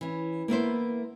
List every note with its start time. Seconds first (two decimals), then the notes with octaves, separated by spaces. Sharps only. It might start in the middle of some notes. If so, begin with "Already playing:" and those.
0.01 E3 C#4
0.48 A#3 B3 E4 C5